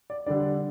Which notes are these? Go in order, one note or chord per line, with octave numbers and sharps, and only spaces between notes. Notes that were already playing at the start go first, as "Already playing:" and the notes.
D5
D3 G3 D4 D5